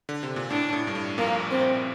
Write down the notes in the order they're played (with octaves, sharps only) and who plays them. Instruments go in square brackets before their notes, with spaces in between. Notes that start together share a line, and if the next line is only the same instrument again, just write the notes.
[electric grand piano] D3
C3
A#2
[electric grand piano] A2 [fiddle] D4
[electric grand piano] A2
G2
A2
[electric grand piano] A#1 A#2 [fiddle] A#3
[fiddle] C4